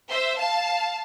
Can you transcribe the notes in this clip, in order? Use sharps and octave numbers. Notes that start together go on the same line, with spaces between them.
C5 E5
F5 A5